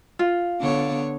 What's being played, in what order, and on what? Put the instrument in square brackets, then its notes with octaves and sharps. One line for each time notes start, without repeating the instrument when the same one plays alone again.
[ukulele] F4
[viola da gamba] D3 B3 C#5